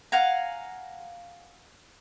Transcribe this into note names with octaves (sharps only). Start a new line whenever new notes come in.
F5 F#5 G#5 A#5